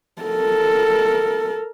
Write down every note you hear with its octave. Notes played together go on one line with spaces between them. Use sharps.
A4 A#4